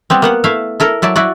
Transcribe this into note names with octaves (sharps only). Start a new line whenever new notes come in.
G3 B3 C4
A#3 B3 F#5
A3 E4 E5 F5
E4 A4 A#4
F#3 E4 D5 A5
E4 F#4 D5